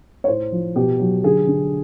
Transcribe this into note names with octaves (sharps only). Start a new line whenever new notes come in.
C#5
A2 C5
F3
B2 G4
F#3
D3 G#4
D3